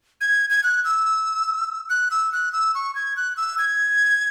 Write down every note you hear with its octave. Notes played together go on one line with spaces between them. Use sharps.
G#6
G#6
F#6
E6
F#6
E6
F#6
E6
C#6
G#6
F#6
E6
G#6